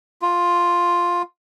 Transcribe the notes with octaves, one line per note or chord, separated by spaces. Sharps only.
F4